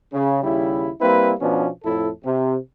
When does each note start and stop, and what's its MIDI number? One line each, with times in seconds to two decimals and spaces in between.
0.13 0.41 49
0.43 0.90 39
0.43 0.90 49
0.43 0.90 55
0.43 0.90 64
1.01 1.33 55
1.01 1.33 58
1.01 1.33 60
1.01 1.33 64
1.01 1.33 71
1.40 1.67 47
1.40 1.67 53
1.40 1.67 59
1.40 1.67 61
1.40 1.67 62
1.84 2.09 41
1.84 2.09 45
1.84 2.09 64
1.84 2.09 69
2.24 2.55 48